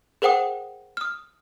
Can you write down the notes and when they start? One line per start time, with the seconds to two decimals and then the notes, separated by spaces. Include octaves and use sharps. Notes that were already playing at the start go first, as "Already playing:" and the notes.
0.22 G#4 A#4 C5 F#5 G5 D#6
0.97 D#6 F6